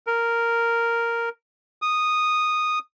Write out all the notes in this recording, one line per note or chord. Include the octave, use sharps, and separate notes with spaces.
A#4
D#6